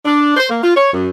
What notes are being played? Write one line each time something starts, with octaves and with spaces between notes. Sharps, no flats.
D4
C5
A#3
F4
C#5
F#2